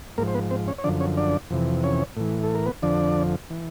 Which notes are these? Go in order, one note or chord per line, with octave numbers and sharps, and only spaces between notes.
G#2 F3 A#3 A#4
C5
B3 B4
C4 C5
C#4 C#5
C#5
F#2 D3 F3 D4 D5
C#4 C#5
D4 D5
F2 C3 E3
C#4 C#5
A2 E3
A4
A#4
B3 B4
F2 D3 F3 D4 D5
E3